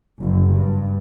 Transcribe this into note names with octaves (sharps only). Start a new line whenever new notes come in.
F#1
G2